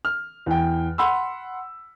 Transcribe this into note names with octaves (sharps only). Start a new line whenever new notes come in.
F6
E2 G5
F#5 B5 C6 E6